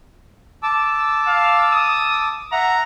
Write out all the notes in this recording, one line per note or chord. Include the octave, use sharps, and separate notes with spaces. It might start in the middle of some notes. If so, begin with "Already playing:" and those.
A5 D6 E6
F5
D#6
E5 F#5 A#5